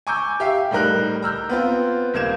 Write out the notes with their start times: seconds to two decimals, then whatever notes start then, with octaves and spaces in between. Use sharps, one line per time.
0.07 G#5 A#5 C#6 D6 E6 G6
0.40 G4 E5 F5
0.71 A2 G3 D#4 A#4 F#6
1.22 A#5 E6 F6 G6
1.49 B3 C4 F4
2.14 D#1 A#3 G#6 E7